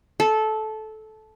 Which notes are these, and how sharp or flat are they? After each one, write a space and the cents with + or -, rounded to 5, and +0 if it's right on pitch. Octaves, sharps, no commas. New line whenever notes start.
A4 -15